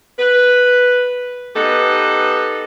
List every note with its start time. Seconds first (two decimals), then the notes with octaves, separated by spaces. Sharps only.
0.19 B4
1.56 B3 D#4 G4 A4 B4